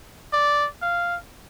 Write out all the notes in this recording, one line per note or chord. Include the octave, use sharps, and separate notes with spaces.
D5
F5